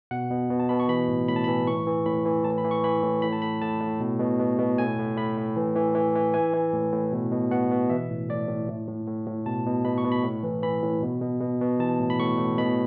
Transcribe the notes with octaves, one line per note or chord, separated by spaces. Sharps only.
B2 F#5
B2
B2
A5
B2 B5
C#6
E3 B5
A2
A2 B5
A5
B5
E3
A2 C#6
E3
A2 B5
E3
A2 A5
B5
E3
C#6
E3 B5
A2
A2 B5
A5
A2 B5
A2 A5
A2
B2
B2
B2
B2
A2 G#5
A2
A2 B5
A2
E3
E3
E3
E3
E3 G#5
E3
A2
A2
B2
B2
B2 F#5
B2
E3 E5
A2
A2 D5
A2
A2
A2
A2
A2
B2 A5
B2
B2 B5
C#6
B2
B5
A2
E3
E3 B5
A2
B2
B2
B2
B2
E3 A5
A2
B5
A2 C#6
A2
B2 B5